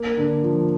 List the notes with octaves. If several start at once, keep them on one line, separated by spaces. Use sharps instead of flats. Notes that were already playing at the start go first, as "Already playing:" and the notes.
Already playing: A#3
D3
F3